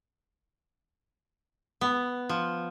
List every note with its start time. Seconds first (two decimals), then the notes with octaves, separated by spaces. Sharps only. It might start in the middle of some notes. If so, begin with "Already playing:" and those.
1.81 B3
2.29 F3